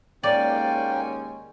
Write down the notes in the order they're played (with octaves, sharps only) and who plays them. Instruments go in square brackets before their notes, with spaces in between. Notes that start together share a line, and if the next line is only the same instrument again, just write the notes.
[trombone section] D#2 D#3 G#3 [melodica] A#3 G5 [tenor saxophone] C#4 [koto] D5